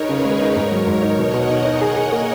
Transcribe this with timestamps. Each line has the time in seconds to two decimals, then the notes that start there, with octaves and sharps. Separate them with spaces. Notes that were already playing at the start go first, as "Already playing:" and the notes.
Already playing: D#4 G#4 A#4 B4 C#5
0.09 C#3
0.25 G#3
0.40 D#4
0.56 G#2 A#4 C#5
0.72 F#3
0.87 G#2
1.02 D#4
1.18 B2 D#5 F#5
1.34 B2
1.50 D#4
1.65 D#4
1.81 G#4
1.96 G#4
2.12 A#3